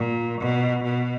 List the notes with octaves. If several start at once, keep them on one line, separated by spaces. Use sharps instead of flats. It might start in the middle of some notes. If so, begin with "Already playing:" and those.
Already playing: A#2
B2
B2